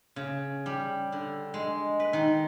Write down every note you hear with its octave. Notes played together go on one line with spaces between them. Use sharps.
C#3
G3
D3
G#3
B4
D#3